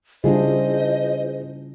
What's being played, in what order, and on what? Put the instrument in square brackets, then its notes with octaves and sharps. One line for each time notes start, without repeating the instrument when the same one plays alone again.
[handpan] C#3 G3 D4 [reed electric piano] E4 F4 G#4 [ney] C5 [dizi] D#5